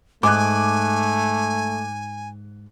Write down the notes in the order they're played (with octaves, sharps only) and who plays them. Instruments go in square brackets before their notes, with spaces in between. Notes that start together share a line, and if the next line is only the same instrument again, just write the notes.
[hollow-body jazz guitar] G#2 [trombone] A3 [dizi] G#5 [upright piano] D6 F#6